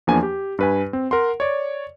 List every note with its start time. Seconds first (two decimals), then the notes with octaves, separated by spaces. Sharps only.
0.07 E2 F3 A#3 D4 G#5
0.23 G4
0.59 G2 B4 G#5
0.93 C4
1.11 A#4 F#5 C6
1.40 C#5 D5